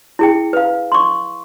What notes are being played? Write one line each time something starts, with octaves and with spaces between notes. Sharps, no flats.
E4 G#4 G5
B4 F5
C6 C#6